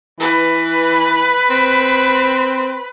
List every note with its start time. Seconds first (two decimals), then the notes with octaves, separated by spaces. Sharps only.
0.20 E3 B4
1.50 C4